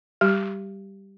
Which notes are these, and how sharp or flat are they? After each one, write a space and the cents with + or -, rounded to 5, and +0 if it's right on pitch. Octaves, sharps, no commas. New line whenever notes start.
G3 +0 G4 +0